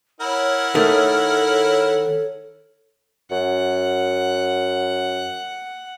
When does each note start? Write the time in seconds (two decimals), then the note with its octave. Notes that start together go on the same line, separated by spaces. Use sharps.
0.21 E4 A#4 C#5 F#5
0.75 D#3 A3 A4
3.31 F#2 F#5